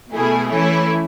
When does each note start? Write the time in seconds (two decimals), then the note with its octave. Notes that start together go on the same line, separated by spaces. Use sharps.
0.12 B2 A3 E4 G#4
0.50 E3 A3 C#4 E4